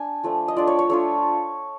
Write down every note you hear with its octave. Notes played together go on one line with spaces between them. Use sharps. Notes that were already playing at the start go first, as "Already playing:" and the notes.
Already playing: D4 G#5
F3 A3 D4
D#5
A3 D4 F4 D5
C#5
C#5
A3 D4 F4 C#5